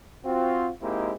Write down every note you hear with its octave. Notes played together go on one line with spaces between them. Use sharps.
C4 F4 F#4
G#3 A#3 C4 D#4 E4 G4